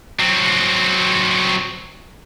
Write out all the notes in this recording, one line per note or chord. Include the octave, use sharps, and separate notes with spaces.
F#3 C4